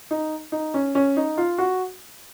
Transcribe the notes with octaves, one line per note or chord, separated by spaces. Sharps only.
D#4
D#4
C#4
C#4
D#4
F4
F#4